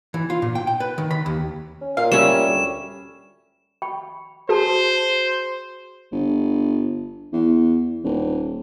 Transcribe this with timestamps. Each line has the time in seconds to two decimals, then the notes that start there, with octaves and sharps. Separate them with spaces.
0.14 E3
0.30 F4
0.42 A#2
0.55 G5
0.67 G5
0.80 B4
0.98 D#3
1.11 B5
1.26 D#2
1.81 C#4
1.97 A#2 F5
2.12 G3 C#4 C#5 E5 E7
2.47 D2
3.82 G5 B5 C#6
4.49 F#4 G#4 C5 A5 C6
6.11 G1
7.33 E2
8.04 D#1